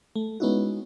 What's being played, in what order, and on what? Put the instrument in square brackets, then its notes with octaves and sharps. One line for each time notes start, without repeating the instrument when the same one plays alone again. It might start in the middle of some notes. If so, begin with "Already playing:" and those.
[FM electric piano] A3
G#3 B3 C#4 D#4 E4 F#4